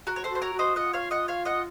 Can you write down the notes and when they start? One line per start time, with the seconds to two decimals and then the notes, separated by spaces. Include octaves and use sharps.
0.07 F#4 A#4
0.16 C#5
0.24 A4 C5
0.30 F#4
0.35 C5
0.42 A#4 C#5
0.54 F#4
0.59 C5 D#5
0.76 F4 D#5 F#5
0.93 C#5 F5
1.11 D#5 F#5
1.28 C#5 F5
1.45 D#5 F#5